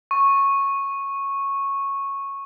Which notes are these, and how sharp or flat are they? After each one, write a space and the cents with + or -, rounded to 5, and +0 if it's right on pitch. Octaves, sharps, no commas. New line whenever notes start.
C#6 -10